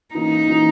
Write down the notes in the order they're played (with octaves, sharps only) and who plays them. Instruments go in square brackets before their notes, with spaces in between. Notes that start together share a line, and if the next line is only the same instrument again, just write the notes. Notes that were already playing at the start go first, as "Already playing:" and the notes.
[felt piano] E3 A#3 C#4 [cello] D#4
[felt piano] E3 A#3 C#4